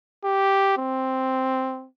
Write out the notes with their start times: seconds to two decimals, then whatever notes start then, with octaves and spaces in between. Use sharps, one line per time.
0.24 G4
0.78 C4